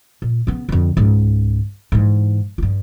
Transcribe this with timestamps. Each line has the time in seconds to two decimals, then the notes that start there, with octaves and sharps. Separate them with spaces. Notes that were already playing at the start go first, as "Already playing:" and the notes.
0.22 A#2
0.47 C#3 B3
0.69 F2 D3
0.97 C#2 G#2
1.92 G#2 E3
2.58 G2 F4